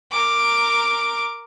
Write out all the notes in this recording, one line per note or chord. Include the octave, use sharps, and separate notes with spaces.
A#4 D6